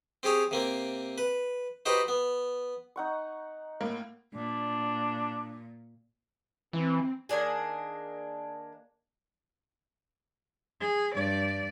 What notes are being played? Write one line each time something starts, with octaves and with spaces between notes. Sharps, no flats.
C4 G4 G#4 C#5
C3 A#3 C4
B4
D#4 F#4 G4 B4 C5
B3
D#4 F#5 C#6
A2 A#3
A#2 D4
E3 C4
D#3 A#3 D4 G#4
G#4
G2 D5